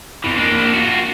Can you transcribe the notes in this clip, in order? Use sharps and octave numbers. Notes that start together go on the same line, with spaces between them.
F2 E3
A#3 D4
F4 F#4